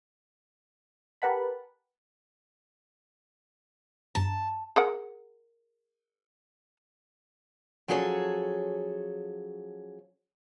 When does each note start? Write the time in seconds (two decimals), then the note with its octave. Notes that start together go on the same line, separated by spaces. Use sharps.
1.22 G4 A#4 B4 F#5 A5 B5
4.15 G2 A5 A#5
4.76 G#4 A#4 F#5
7.88 F3 F#3 C#4 G#4 A4 C#5